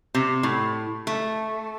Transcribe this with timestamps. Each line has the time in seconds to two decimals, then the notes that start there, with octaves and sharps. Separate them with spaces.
0.14 C3
0.43 A2
1.07 A3